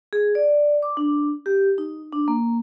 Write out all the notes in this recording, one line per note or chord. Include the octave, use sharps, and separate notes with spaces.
G#4
D5
D6
D4
G4
D#4
D4
A#3